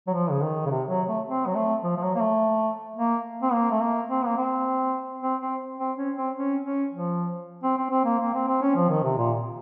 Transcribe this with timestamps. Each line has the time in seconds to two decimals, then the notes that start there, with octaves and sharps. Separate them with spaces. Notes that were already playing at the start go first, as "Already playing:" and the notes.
0.07 F#3
0.14 F3
0.31 C#3
0.42 D#3
0.66 C#3
0.70 C3
0.89 F#3
1.08 A3
1.27 C4
1.46 F#3
1.55 A3
1.83 F3
1.96 F3
2.03 F#3
2.15 A#3
2.21 A3
2.96 A#3
3.42 C4
3.52 A#3
3.71 A3
3.81 A#3
4.10 C4
4.26 A#3
4.37 C4
5.23 C4
5.41 C4
5.79 C4
5.98 C#4
6.16 C4
6.36 C#4
6.64 C#4
6.92 F3
7.63 C4
7.77 C4
7.91 C4
8.04 A#3
8.19 A#3
8.33 C4
8.47 C4
8.62 C#4
8.76 F3
8.89 D#3
9.04 C3
9.18 A#2